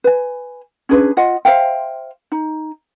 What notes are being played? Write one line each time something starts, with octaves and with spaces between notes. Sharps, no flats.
B4 G#5
C#4 D4 G#4 B4
F4 D#5 F#5
C5 E5 F5 G5
D#4